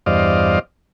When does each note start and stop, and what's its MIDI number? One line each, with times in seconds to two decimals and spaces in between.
0.06 0.59 40
0.06 0.59 43
0.06 0.59 72
0.06 0.59 74
0.06 0.59 75
0.06 0.59 77